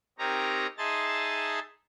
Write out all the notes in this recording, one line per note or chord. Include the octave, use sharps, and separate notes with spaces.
C4 D#4 G4 A#4 C#5 A#5
D#4 G#4 E5 A5 C6 A6